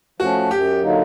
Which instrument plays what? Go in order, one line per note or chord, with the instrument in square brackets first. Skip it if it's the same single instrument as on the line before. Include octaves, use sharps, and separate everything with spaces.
[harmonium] F3 A3 C#4 [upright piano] F#4
[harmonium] F#2 [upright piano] G4
[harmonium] D3 F#3 A#3 D#4